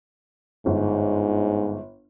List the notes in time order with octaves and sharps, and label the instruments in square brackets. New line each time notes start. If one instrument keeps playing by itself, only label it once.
[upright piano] G1 [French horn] G#2